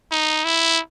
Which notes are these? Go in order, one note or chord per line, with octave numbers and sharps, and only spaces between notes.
D#4
E4